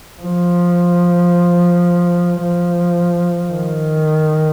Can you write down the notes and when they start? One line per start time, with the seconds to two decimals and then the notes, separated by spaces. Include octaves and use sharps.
0.23 F3
2.42 F3
3.52 D#3